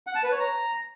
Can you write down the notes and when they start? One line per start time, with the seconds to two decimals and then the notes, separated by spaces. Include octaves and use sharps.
0.07 F#5
0.15 A5
0.23 B4
0.31 C#5
0.40 A#5